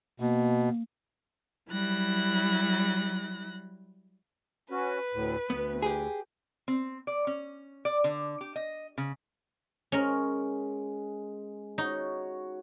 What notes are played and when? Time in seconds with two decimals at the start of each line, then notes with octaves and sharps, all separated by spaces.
0.20 B2 A#3
1.70 F#3 G3 E4 F#6 A#6
4.71 C#4 F#4 B4
5.14 D2 A2
5.50 D2 B3
5.82 G4 G#4
6.68 C4
7.07 D5
7.27 C#4
7.85 D5
8.04 D3
8.41 G4
8.56 D#5
8.98 C#3
9.92 G#3 C#4 A#4
11.78 D#4 F#4 C#5